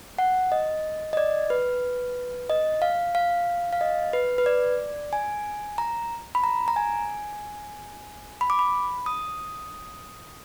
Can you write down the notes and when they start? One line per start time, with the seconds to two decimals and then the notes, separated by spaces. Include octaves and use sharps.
0.18 F#5
0.52 D#5
1.13 D#5
1.17 D5
1.50 B4
2.50 D#5
2.82 F5
3.15 F5
3.73 F5
3.81 D#5
4.13 B4
4.38 B4
4.46 D5
5.13 G#5
5.78 A#5
6.35 B5
6.44 A#5
6.68 A#5
6.76 G#5
8.41 B5
8.50 D6
8.59 B5
9.06 D#6